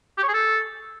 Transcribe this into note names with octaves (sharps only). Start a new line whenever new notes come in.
G4
C#5
G#4
A4